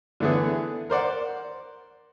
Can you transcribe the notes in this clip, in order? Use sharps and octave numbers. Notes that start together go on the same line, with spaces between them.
D3 E3 A3 B3 G#4
A#4 C5 D5 F#5